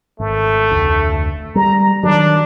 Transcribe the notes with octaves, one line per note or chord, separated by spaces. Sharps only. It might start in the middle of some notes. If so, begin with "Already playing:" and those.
G#1 A3
F1 D2
G3 A#5
D#3 F#3 D4